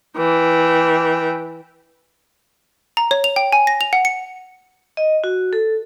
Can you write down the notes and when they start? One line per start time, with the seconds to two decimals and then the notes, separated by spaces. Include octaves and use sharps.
0.17 E3 G5
2.97 A#5
3.11 C#5
3.24 F7
3.36 G5
3.52 G#5
3.67 A#6
3.81 F7
3.93 F#5
4.05 C#7
4.97 D#5
5.24 F#4
5.53 A4